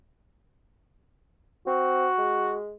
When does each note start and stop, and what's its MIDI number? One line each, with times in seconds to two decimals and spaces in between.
1.67 2.07 60
1.67 2.56 66
2.18 2.74 56